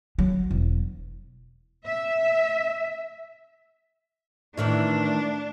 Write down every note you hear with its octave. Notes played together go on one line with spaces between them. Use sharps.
F#3
E1
E5
A2 D#3 E3 D4